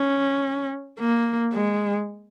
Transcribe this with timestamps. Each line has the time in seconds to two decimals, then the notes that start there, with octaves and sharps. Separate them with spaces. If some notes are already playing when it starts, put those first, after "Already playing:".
Already playing: C#4
0.99 A#3
1.54 G#3